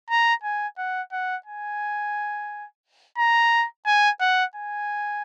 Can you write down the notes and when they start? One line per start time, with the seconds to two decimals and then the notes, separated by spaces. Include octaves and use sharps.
0.10 A#5
0.43 G#5
0.78 F#5
1.12 F#5
1.46 G#5
3.18 A#5
3.86 G#5
4.21 F#5
4.55 G#5